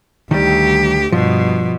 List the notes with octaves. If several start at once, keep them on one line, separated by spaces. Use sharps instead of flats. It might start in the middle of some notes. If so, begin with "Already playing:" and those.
D2 D#3 G3 G4
G2 B2 F3